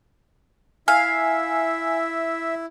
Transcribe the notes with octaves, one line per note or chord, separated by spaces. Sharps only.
E4 E5 F5 G#5